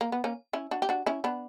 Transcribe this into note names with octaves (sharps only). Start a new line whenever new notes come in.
A#3
B3
A#3 C#4
C#4 E4
D4 F#4
G4
D4 F#4
C#4 E4
B3 D4